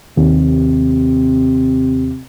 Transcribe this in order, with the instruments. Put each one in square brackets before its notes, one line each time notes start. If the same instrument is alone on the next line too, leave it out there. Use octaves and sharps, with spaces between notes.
[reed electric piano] D#2 [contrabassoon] C3